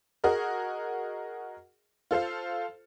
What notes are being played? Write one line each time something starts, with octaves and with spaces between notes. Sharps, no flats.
F#4 G#4 A#4 D#5
F4 A4 C5 F5